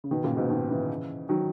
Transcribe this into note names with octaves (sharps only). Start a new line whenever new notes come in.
C#3
B2 D#3
A#2 C#3
G#2 B2
B2 D#3
C#3 E3
D#3 F#3